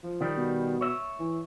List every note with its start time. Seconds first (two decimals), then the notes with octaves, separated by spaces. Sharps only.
0.03 F3
0.21 D#3 G3
0.37 B2
0.81 C#5 E5
1.19 E3